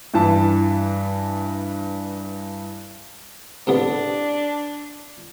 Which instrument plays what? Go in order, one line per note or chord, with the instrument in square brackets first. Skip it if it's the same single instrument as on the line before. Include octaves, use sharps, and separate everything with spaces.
[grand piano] G2 E3 A5
[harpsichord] A2 C3 B3 [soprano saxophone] D4